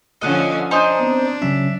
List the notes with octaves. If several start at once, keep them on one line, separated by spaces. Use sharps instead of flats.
D3 F3 C#4 D#5 F#5
D4 D#4 C5 G#5 D#6 G6
B3 C4
C#3 F#3 C#4 E5